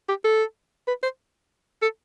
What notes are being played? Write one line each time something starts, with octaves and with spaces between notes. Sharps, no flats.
G4
A4
B4
C5
A4